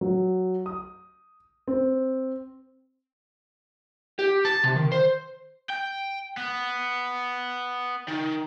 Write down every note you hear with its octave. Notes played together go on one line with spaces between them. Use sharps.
F#3
D#6
C4
G4
A5
C3
D#3
C5
G5
B3
D#3